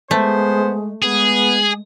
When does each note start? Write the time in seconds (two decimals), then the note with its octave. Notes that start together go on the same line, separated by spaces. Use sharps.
0.11 G#3 A3 B3 C5
1.03 G#3 B3 G#4